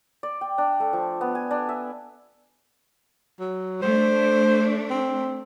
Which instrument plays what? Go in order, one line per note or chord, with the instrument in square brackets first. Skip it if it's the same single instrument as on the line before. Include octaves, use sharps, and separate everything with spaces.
[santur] D5
G5
D4
A3
F3
B3
G#5
D4
E5
[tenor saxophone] F#3
[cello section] A3 D4 [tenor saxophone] C5
[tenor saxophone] C4